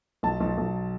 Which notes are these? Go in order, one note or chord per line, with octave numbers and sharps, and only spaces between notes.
B1 A5
B1
B1